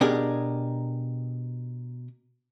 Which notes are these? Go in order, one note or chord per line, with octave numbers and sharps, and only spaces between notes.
B2 D4 G4 G#4 A#4